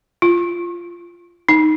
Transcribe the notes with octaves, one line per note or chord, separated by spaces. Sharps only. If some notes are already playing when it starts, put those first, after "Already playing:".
F4
D#4